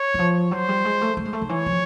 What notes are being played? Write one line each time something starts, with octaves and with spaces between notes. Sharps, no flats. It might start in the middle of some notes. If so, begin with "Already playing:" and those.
Already playing: C#5
E3
F3
F#3 C5
G3
G#3
A3
A3
G#3
A3
D#3
E3 C#5
F3